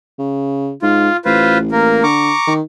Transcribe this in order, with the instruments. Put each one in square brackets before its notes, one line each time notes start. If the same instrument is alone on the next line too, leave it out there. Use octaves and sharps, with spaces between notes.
[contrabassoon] C#3
[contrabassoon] G#2 [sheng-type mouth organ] F4
[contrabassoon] A1 [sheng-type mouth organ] F4 B4 C5
[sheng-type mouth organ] A#3 A#4
[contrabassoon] D3 [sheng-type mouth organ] A#5 C#6 D6
[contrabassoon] D#3